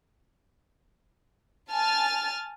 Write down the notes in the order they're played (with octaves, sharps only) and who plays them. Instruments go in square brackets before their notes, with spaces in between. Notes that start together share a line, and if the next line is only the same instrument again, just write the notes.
[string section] G#5 A5 F6 A6